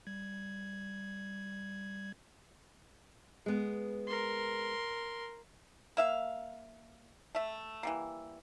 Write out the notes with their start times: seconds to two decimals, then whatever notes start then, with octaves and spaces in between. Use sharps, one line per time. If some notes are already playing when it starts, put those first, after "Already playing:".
0.07 G3 G#6
3.46 G#3 B3
4.08 A#4 C6
5.97 A#3 E5 F5
7.35 A3 E5
7.83 E3 G3 A#3